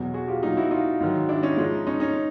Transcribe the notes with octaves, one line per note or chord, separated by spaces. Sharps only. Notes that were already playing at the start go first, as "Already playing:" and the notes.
Already playing: E2 B2 F#3
F#4 G#4
F4 G4
A#2 F#3 D#4 F4
E4 F#4
D#4 F4
G#2 D#3 F#3
D4 E4
C#4 D#4
G#2 F3 G#3
C#4 D#4
C#4 D#4